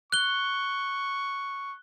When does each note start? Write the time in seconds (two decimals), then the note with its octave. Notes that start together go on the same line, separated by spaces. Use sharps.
0.12 C#6 F#6 G7